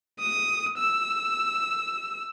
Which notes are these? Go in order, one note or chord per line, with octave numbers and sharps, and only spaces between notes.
D#6
E6